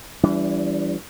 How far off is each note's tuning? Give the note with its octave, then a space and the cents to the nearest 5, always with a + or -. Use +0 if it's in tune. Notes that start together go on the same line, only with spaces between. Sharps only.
E3 +20 G3 +0 D4 -40